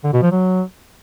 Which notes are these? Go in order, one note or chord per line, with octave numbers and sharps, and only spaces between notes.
D3
B2
F3
F#3